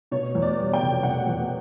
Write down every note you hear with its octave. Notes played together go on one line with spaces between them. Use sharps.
B2 C#5
E2
D5
G3
G5
F1
B2 F#5
E2